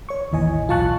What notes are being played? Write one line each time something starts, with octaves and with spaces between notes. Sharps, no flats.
C#5 C#6
A1 D#2 E3 D#5 G#5
B1 F4 F5 A5 C#6 F#6